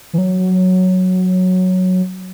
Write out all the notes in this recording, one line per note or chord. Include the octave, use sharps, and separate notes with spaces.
E3
F#3